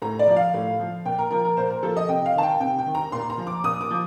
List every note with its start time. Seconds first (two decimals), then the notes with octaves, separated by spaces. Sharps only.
0.02 A2 A#5
0.19 D5
0.27 F3
0.36 F5
0.54 A2
0.80 F3
1.05 A#2 G5
1.19 A#4
1.31 F3 A#4
1.45 A#4
1.57 A#2 C5
1.70 A#4
1.83 F3 A4
1.97 D#5
2.08 C3 G5
2.26 F5
2.35 D#3 A5
2.43 G5
2.61 C3 G5
2.79 G5
2.86 D#3
2.95 A#5
3.12 A#2 C6
3.30 A#5
3.38 F3
3.47 D6
3.64 A#2 D#6
3.81 D6
3.91 F3